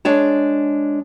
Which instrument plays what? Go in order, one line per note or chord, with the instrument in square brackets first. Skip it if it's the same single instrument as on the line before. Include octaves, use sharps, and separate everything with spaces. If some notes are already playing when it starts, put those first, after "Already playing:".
[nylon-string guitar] G#3 D4 C#5 A5